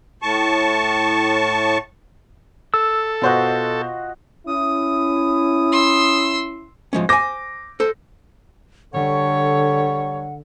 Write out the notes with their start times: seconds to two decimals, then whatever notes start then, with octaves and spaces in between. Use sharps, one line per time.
0.22 A2 A5 C#6
2.74 A4 E6
3.22 B2 F4 F#4 C5 D#5 F#6
4.47 C#4 E4 D#6
5.72 C6 E6
6.93 F3 G#3 C#4
7.09 C5 G#5 D6 A#6
7.80 A4 C5
8.94 D3 G3 A4 C#5 F#5